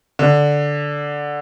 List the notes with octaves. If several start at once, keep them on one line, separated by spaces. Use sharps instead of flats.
D3